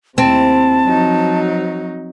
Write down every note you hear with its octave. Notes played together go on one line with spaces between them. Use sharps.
D#2 C3 C4 E4 A5
F3 F#3 D#4